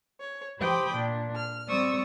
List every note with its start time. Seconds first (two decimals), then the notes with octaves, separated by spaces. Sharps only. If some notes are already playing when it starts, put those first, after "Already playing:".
0.20 C#5
0.59 G4 C5 G5 B5 D6 D#6
0.93 A#2 D4
1.35 F6
1.68 G3 C4 D5 C#6 D#6 E6